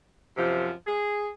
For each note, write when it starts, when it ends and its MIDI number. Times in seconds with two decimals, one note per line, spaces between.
0.37 0.71 42
0.37 0.71 48
0.37 0.71 53
0.87 1.28 68